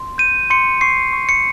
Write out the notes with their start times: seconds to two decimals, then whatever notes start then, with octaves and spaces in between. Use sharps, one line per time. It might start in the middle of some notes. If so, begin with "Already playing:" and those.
Already playing: C6
0.18 G6 D#7
0.50 C6 C#7
0.81 C#6 C7
1.13 C#6
1.29 C#7